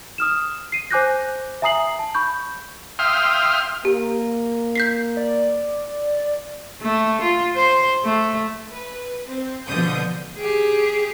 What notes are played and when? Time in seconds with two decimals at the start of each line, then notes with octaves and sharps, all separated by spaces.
0.18 D#6 F6 E7
0.72 C7 D#7
0.91 C5 G#5 D6 F#6 G6 A#6
1.62 E5 G#5 A#5 D#6 C7 F#7
1.99 A5
2.15 B5 C#6 G6
2.99 E5 F5 G5 C6 D#6 F6
3.85 A#3 G4
4.75 G6 B6 C7
5.17 D5
6.82 A3
7.21 F4
7.56 C5
8.04 A3
8.71 B4
9.27 C4
9.65 B2 D3 F3 D#6 G6
10.36 G4 G#4